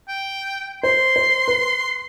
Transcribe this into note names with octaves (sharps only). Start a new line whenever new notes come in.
G5
C5 C6
C5
B4